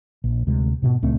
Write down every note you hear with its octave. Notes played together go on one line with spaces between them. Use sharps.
A#1
D2 C3 G#3
G#2 B2
C#2 A#2 A3 C4